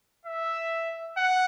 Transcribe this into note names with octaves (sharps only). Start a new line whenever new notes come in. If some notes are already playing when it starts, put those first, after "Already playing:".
E5
F#5